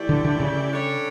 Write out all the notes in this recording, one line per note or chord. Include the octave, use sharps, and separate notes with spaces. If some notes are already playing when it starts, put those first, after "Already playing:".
Already playing: E3 A3 E4 G4 D5
D3
D3
C#3
G3 D4 A4 C#5